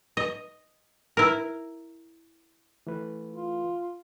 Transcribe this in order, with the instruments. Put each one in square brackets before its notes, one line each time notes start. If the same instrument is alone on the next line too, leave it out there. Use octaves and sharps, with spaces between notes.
[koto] D#5
E4 A#4
[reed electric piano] E3 A3 B4
[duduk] F4